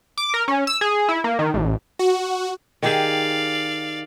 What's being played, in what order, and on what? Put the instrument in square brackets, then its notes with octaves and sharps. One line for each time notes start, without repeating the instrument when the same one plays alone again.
[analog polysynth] D6
A#4
C#4
E6
G#4
E4
A#3
D#3
A1
[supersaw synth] F#4
[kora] D#3 G4 G#4 [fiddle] D5 F5